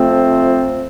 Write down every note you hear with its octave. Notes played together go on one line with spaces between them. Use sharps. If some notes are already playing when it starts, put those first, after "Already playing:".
Already playing: F2 F3 A3 C4